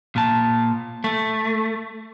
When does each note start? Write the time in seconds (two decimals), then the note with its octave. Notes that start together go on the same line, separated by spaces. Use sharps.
0.16 A#2 A5
1.04 A3